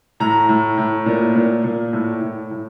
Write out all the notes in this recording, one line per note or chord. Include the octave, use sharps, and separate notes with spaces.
A2 A#5
A2
A2
A#2
A#2
A#2
A2
A2
A2